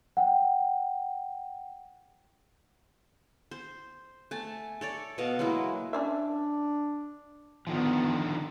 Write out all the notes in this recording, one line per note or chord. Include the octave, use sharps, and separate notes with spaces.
F#5 G5
C5
A3 G#5 A5
A4 C#5 D5
B2 D#5 F5 F#5
F#3 G#3 A#3 E4
C#4 D4 D5 E5
D3 D#3 F3 B3 F4